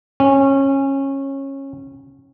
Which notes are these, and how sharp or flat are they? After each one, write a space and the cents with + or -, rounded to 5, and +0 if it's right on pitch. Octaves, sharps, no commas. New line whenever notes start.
C#4 -20